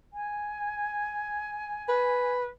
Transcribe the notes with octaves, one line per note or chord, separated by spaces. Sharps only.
G#5
B4